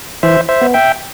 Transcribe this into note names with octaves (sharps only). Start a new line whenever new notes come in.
E3 C5 E5
C5 E5
B3
E5 G5